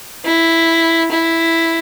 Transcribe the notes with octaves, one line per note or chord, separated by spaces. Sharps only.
E4
E4